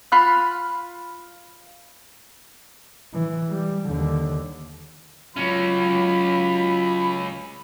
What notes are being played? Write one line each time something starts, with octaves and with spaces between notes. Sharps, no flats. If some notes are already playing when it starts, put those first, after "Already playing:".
F4 B5 F6 F#6
E3
G3
D#2 D3
C#2 F#3 C#4 F4 B5